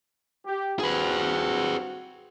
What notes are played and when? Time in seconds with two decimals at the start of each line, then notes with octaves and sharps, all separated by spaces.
0.45 G4
0.79 G2 C4 F#4 G#4 B4